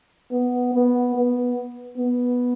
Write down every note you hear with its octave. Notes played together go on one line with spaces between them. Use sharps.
B3
B3
B3
B3